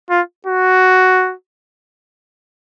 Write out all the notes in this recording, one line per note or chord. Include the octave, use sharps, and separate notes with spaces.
F4
F#4